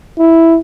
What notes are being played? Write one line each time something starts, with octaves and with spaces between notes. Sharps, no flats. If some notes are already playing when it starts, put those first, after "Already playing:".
E4